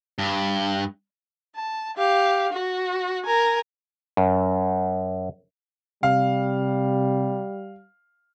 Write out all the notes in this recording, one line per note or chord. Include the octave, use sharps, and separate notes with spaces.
G2
A5
G4 F5
F#4
A#4 G#5
F#2
C3 G3 F5